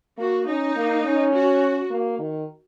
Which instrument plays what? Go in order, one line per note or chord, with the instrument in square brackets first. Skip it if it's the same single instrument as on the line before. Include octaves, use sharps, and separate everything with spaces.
[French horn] A#3 [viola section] F#4
[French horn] C#4 [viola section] D#4
[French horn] A#3
C#4
[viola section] F#4
[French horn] A#3
D#3